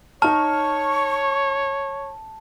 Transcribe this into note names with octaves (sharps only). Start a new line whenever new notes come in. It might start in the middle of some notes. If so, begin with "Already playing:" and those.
D#4 C#5 A5 C#6 F6